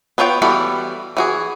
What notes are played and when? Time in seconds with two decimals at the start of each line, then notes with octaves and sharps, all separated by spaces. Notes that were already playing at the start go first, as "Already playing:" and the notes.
0.18 B3 D4 F4 C#5 G5
0.42 E3 G3 B3 F#4 A4
1.17 E3 F#4 G#4